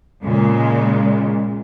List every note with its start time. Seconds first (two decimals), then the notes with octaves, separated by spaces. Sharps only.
0.23 A#2 C#3 G#3